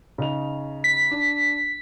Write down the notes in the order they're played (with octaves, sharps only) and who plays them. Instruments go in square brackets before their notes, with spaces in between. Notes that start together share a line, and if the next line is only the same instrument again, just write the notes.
[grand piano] C#3 D#4 F7
[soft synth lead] B6
[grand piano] D4